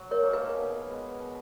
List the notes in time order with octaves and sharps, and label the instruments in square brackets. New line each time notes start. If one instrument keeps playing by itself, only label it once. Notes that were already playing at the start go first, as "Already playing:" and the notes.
Already playing: [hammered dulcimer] F#3
[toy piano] A#4 C#5
[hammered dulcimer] A#3 D#4 G#4
[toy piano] B4
[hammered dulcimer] B2
G#3 B3
B2